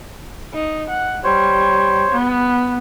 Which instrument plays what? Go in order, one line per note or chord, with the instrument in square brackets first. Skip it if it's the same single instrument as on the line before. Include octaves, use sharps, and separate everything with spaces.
[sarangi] D#4
F#5
[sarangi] G3 [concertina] C5 C#5
[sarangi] B3